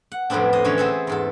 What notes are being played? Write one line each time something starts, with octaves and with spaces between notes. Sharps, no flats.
F#5
F2 A2 G3 B3 C4 D4
D4 C5 D#5
D3 E3 C4 C#4 C#5
C4 G#4 A4 B4 E5 F#5
E2 G#2 A4